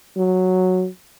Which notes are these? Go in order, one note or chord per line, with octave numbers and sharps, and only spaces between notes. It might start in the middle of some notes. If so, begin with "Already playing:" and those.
F#3